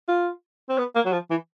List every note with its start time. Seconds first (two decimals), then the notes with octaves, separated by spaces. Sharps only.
0.08 F4
0.69 C4
0.78 B3
0.95 A#3
1.05 F#3
1.12 F3
1.30 E3